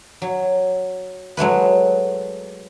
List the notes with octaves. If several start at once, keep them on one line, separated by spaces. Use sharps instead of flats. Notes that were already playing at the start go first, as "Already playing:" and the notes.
F#3
F#3 G#3 A3 B4